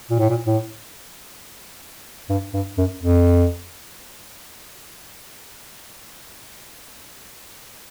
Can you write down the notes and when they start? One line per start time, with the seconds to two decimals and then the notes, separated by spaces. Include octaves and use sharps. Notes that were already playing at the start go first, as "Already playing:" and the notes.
0.10 A#2
0.19 A2
0.30 A#2
0.46 A2
2.29 G2
2.54 G2
2.78 F#2
3.03 F2